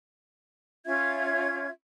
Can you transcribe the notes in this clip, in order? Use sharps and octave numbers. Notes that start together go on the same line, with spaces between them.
C#4 F4 E5 G#6